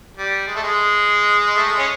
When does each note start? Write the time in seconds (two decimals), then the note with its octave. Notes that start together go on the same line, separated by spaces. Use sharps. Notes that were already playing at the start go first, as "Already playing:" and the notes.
0.17 G3
0.47 G#3
0.55 A3
0.63 G#3
1.56 A3
1.67 G#3
1.78 C#4